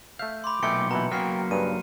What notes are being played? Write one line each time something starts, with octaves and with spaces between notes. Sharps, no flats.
A3 E5 F5 G6
B5 C6 D6
B1 A#2 E3 A3 D#4 G5 C#7
B2 E3 A#5 B5
F#3 A#3 B3 C#4 G5 F6 C7
G2 C#3 B4 D#7